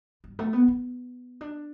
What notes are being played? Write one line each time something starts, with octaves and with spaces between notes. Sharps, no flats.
G2
A3
B3
B3
D4